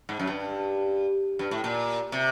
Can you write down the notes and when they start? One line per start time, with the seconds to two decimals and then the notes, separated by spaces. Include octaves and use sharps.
0.09 G#2
0.19 F#2
0.27 G2
1.39 G2
1.51 A2
1.64 A#2
2.12 C3